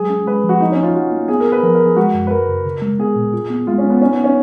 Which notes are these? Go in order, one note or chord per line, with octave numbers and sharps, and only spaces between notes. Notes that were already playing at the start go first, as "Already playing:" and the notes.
Already playing: F#3 G#3 G#4
C#4
G#3 B4
F3
F#4
A#3 D#4
C#4
A#3 F4
A#3 F#4
A#3
B3 G#4
A#4
B3
B4
F3 A#4
A#4
F3
G#4
G#3 F#4
F#2
B4
F2 A#4
C#3
C#3
G#3
B3 G#4
A#2
F4
B3
G#3 F4
C#4
G#3
B3
C#4 D#4
B3
D#4
C#4